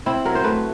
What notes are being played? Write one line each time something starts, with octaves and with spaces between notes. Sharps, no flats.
C4 E4
F#3 A#4
C5
A3 B4